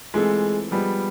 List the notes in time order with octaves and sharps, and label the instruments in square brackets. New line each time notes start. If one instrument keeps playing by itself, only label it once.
[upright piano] E3 A3 C4 F4 A4 [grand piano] G#3
[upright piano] F3 G#3 B3 [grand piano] G3